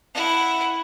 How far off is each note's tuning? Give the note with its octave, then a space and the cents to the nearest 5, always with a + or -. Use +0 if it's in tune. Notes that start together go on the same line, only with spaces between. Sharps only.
E4 +0 F#5 +0